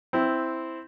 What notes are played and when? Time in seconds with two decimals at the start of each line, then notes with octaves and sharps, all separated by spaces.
0.13 C4 E4